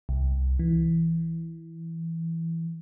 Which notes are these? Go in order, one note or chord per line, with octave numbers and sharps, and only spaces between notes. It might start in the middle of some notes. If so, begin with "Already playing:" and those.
C2
E3